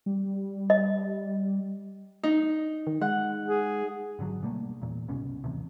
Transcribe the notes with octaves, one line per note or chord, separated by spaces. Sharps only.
G3
D#5
D#4
D#3
G#3 F#5
G#4
G#1 D3 F#3
B2 G3 A3 A#3
E2 A#2
F#1 C2 B2 C#4
A1 D#2 C3